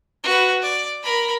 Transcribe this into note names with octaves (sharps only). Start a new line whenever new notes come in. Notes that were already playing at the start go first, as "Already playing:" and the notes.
F#4 B4
D5
A#4 B5